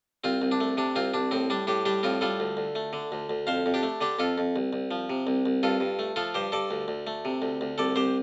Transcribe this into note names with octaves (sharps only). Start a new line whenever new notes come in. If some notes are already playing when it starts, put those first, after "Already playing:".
C2 C4 F4
C2
D4
A3
C3 D4
C2 C4 F4
C2 D4
A2 C4
G3 D4
A2 D4 G4
G3 D4 G4
A2 C4 F4
G3 F4 A4
D2
D2
A3
D3
D2
D2
F2 C5 F5
F2
D4 G4
A3
D3 D4 G4
F2 F4 A4
F2
C2
C2
F3
C3
C2
C2
G2 F4 A4
G2
A3
F3 F4 A4
G2 G4 C5
G2 A4 D5
D2
D2
A3
C3
D2
D2
C2 A4 D5
C2 G4 C5